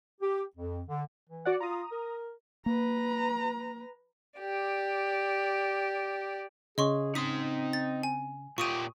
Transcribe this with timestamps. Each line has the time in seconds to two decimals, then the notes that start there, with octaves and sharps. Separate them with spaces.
0.21 G4
0.56 F2
0.88 D3
1.29 E3
1.45 F#4 D5 F#5
1.61 F4 A#5 D#6
1.92 A#4
2.66 A#3 B4 A#5
4.40 G4 D5
6.78 C#3 C#4 G#4 D#5 C6 C#6
7.15 C4 D#4 C6 D#6 B6
7.73 A6
8.03 G#5
8.58 A#2 F4 G4 C#6 D#6 D#7